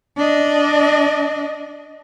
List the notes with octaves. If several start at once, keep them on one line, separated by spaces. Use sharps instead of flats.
D4 D#5